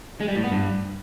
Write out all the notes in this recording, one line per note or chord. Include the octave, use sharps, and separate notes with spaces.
G#3
G3
A2
B3
G2